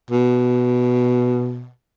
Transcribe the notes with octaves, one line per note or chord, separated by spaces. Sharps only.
B2